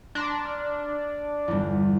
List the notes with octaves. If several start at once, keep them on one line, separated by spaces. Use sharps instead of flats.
D4 A#5 C6 A#6
F6
G1 E2